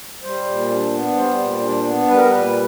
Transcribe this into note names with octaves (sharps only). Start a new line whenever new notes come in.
G3 C5
A#2
D4
B3
G3 C5
A#2
D4
B3
G3 B4
A#4
B4
A#2